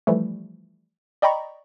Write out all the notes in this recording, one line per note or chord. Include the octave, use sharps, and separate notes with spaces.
E3 F3 G3 A3
D5 D#5 G5 A#5 B5 C#6